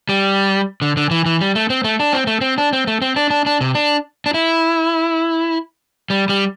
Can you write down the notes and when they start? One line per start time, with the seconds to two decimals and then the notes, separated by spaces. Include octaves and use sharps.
0.09 G3
0.82 D3
0.97 D3
1.11 E3
1.26 E3
1.41 G3
1.55 A3
1.70 C4
1.84 A3
2.00 D4
2.13 C4
2.27 A3
2.41 C4
2.58 D4
2.73 C4
2.87 A3
3.02 C4
3.16 D4
3.30 D4
3.46 D4
3.61 C3
3.75 D4
4.26 D4
4.34 E4
6.10 G3
6.29 G3